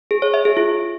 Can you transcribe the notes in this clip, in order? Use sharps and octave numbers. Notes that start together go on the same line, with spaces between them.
G#4
C#5
E5
G#4
F4